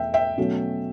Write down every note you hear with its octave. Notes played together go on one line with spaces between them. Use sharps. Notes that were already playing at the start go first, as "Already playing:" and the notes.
Already playing: E2 B2 A3 E5 G5
E5 G5
B2 F#3 A3 C#4